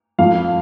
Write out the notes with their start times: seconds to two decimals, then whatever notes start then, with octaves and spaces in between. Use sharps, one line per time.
0.19 F2 F5